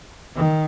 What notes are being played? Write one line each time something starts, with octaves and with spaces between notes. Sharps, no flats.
D#3